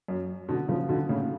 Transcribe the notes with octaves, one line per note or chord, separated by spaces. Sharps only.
F#2
B2 D3
C#3 F3
B2 D3
A2 C#3